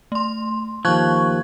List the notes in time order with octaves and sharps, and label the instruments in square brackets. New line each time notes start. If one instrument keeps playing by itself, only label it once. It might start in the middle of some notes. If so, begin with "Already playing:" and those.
[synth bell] A3 C6
[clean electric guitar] D#2 F3 [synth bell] C#6 F#6 G#6